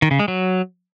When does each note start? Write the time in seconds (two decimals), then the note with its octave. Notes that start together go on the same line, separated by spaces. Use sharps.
0.02 D#3
0.11 C#3
0.19 G#3
0.28 F#3